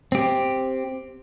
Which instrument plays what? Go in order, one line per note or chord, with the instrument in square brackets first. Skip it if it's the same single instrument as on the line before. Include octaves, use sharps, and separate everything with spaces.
[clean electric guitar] C4 G4